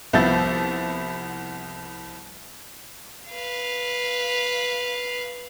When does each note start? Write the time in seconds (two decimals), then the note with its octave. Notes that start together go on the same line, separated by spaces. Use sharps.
0.13 C2 F3 B3 E5 G6 A6
3.30 B4 F5